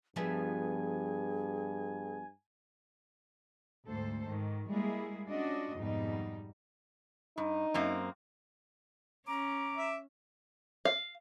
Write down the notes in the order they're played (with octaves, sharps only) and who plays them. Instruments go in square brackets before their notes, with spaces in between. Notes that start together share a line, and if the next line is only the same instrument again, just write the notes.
[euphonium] G2 [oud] F3 B3 E5 [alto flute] G#4 [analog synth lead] G#5
[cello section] D2 G#2 A4 C5
G#2 D#3
G3 G#3 A#3 E4 G#4
C#4 D4 F4 F#4 D5 D#5
F2 G#2 B2 G3 D#4
[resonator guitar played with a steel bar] G2 [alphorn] D#4
[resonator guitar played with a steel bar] F#2 A#3 C4
[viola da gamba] C#4 [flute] A#5 [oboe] D6
[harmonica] E5
[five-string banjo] F5